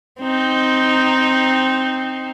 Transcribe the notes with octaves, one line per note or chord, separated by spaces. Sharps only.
C4 D#4